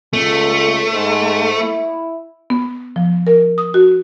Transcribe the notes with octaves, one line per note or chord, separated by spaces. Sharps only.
C#2 A3
G#2
E4
B3
F3
A#4
D#6
F#4